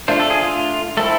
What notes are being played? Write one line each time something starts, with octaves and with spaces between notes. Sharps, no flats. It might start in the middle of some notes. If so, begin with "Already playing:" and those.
A3 D4 F4 C5
A4
G#4
F4
A3 C4 E4 A4